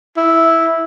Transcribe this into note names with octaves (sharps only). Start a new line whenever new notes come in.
E4